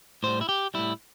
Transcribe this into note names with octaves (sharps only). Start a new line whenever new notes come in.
A2 G3 C5
E4
G4
A2 G3 E4